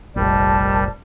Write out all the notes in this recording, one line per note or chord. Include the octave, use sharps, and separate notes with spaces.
F1 A#1 G3 A#4 D#5 A5